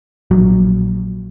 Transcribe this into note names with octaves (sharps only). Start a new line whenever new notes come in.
A#1 F#3